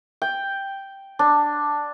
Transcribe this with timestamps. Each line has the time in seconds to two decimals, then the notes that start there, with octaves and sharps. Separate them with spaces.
0.22 G5
1.19 D4